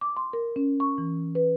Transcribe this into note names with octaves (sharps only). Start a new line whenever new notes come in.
D6
C6
A#4
C#4
C#6
E3
B4